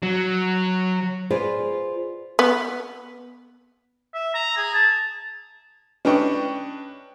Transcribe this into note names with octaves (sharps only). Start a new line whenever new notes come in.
F#3
F4 G#4 B4 C5 D5
B3
E5
A#5
G#4
A5
C#4 D4 B4 D#5 G5 C#6